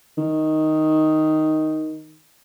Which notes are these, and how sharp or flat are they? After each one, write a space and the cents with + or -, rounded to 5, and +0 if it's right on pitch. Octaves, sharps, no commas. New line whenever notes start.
D#3 +5